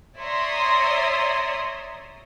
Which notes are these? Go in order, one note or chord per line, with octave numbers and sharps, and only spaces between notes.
C#5 D5 E5 A#5 C6 D#6